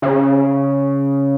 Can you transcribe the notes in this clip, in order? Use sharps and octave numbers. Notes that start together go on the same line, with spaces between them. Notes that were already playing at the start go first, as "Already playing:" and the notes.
C#3